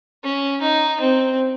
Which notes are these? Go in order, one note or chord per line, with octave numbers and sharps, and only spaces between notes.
C#4
D#4
C4